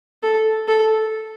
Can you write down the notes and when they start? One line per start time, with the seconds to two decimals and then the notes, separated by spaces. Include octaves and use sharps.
0.23 A4
0.68 A4